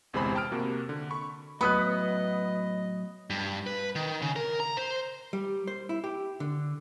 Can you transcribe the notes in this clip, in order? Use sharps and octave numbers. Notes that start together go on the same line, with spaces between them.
G1 E2 C3 G#3 C5 B5
G5 A5 D#6 F6 D7
C3 A#3 F#4
D3
B5 C#6
A2 F#3 B3 D#5 B5 D#6 F#6
G2
B4
D#3
C#3
A#4
A#5
C5
G3
C5
E4
G4
D3